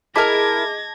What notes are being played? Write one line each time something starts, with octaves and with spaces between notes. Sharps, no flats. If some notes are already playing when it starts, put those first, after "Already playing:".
E4 G#4 A#4 D#5 A5 D6 G#6 A#6